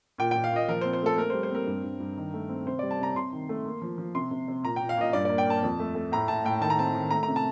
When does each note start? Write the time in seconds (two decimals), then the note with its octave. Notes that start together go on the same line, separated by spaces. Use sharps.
0.18 A#2 G5
0.31 A#2 G5
0.44 F5
0.52 A#2 D#5
0.68 F3 A#4
0.81 C5
0.85 C4
0.93 C5
1.02 A3 A4
1.18 C4 A#4
1.30 G3 C5
1.43 C5
1.50 C4 A#4
1.67 G2
1.83 G2
2.00 G2
2.17 D#3
2.34 A3
2.49 C4
2.66 C3 C5
2.79 G3 D5
2.91 A5
2.99 C3 A#5
3.15 C3 C6
3.33 D#3
3.49 A3
3.65 A#3
3.82 F3
3.98 F3
4.15 C3 C6
4.31 C3
4.48 C3
4.63 A#2 A#5
4.76 A#2 G5
4.89 F5
4.97 A#2 D#5
5.13 G2 D5
5.25 A#3 D5
5.38 G5
5.47 A#3 A5
5.63 F2
5.80 A3
5.95 A3
6.12 A2 A#5
6.28 A2 A5
6.45 A2 G5
6.61 D#3 A5
6.70 A#5
6.79 C4 A5
6.95 D#3
7.11 A3 A#5
7.23 A#5
7.28 C3
7.36 A5